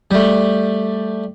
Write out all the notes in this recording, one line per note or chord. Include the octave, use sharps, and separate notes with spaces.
G3 A3